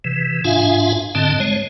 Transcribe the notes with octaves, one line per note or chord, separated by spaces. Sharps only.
C3 E3
G#2 D4 F4 E5 F5 G#5
G#2 D3 C4 D#5 A5
G#3 C#5